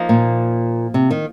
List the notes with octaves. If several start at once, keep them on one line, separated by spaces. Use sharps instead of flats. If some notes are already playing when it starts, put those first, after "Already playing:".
Already playing: F3 A#3 D#4
A#2
C3
D#3